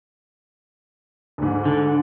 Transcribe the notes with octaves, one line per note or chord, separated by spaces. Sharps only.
D2 G#2
D3